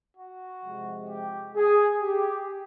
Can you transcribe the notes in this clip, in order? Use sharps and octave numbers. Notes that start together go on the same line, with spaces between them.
F#4
C3 F3 G#3
G4
G#4
G4